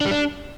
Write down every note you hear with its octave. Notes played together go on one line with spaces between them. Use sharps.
D4
G3
D4